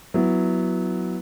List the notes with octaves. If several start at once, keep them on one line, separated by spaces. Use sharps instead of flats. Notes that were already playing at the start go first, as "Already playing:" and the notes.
F#3 B3 E4